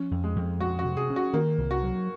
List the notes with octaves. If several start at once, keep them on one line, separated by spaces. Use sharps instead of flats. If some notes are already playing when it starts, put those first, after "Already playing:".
Already playing: F3 C#4
F2
G#3
F2
G#3 F#4
F#4
C3
G#4
C#4
F#4
D#3 A#3
C2
F#4
F#3